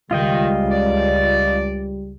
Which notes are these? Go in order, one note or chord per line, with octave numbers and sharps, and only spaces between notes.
C#2 D#3 G3 F4 D#5 G5
D5